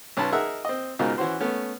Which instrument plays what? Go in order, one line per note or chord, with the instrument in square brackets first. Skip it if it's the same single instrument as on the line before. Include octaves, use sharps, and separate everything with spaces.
[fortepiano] B1 C#4 B4 A5
D#4 G#4 A#4 E5 F#5
C4 D#5
C#2 G#2 B2 D#4 F4 A#4
E3 C#4 F#4 C5
A3 B3 C#4